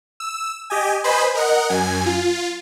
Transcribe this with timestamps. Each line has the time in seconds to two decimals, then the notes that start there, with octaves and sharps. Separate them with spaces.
0.20 E6
0.70 G4 D#5 G#5
1.04 B4 C5 D#5 G#5 B5
1.35 A#4 D#5 F#5
1.69 F#2 G#5
2.06 F4